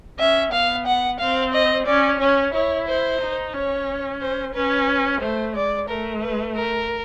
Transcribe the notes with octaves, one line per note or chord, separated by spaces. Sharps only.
C#4 E5
B3 F5
F#5
C4 F5
D#5
C#4 D5
C#4 C#5
E4 C#5
C5
D#4
C#4 C#5
C5
C#4 B4
A3 C5
G#3 D5
A3 A#4
B4
A#4